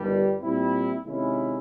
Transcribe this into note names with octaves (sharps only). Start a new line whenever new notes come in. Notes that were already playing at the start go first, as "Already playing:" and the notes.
Already playing: G1 G2 D#3 G3
A#2 G3 C4 E4
C3 D#3 G#3 C#4 E4